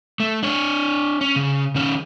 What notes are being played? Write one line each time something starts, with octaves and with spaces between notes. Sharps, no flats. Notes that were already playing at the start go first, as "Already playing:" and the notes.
A3
D4 C#5
C#4
C#3
D#3 C#4